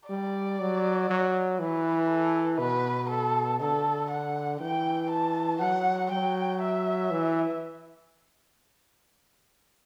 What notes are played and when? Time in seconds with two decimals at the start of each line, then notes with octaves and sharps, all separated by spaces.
0.08 G3 D5
0.60 F#3
1.10 F#3
1.59 E3 B4
2.09 A4
2.59 B2 B4
3.09 A4
3.60 D3 A4
4.10 F#5
4.60 E3 G5
5.11 A5
5.61 F#3 F#5
6.12 F#3 G5
6.62 E5
7.11 E3